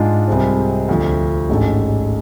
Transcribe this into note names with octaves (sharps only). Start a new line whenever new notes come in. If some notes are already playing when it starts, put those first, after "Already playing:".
Already playing: G#2 G#3 D4 F4
C2 C3 G#3 C4
D2 D3 F3
A1 G#2 G#3 D4 A4